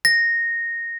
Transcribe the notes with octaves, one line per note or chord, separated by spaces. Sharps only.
A#6